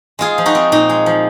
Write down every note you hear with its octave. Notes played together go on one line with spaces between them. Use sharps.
G#3 F4 G#4
F3
D#4 F#4
C4
A#2 D#4
G#3
F3